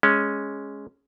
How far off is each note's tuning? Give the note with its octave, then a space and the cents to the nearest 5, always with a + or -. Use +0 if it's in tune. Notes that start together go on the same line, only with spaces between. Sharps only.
G#3 +0 C#4 +0